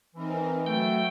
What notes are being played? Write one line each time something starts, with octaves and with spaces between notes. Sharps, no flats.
E3 C4 D#4 A#4
F#3 A3 F#4 G5